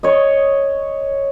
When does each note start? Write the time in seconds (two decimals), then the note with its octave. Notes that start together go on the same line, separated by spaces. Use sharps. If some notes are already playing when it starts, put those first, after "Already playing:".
0.03 C#5 D#5